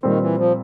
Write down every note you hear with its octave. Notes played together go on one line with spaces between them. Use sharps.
A#2 D#3 G3 C4
E3
F3